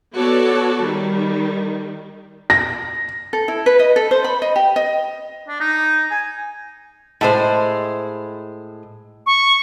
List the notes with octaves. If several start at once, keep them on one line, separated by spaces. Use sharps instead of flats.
B3 F#4 A4 C#5 D5 A5
D#3 G3
A#6
A4
E4
B4
D#5
A4
C5
B5
D#5
G4
D#5
D4
D#4
G#5
A2 G#3 C5
C#6